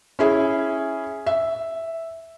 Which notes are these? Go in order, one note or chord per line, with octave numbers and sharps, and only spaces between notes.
C#4 E4 G#4
E5